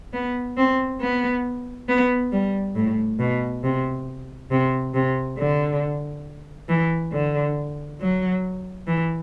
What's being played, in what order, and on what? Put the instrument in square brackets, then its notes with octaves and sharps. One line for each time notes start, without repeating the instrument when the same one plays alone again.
[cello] B3
C4
B3
B3
G3
A2
B2
C3
C3
C3
D3
E3
D3
F#3
E3